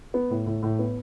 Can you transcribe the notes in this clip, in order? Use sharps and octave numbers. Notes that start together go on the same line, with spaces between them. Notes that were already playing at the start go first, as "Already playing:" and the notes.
B3
A2
A2
A2
B3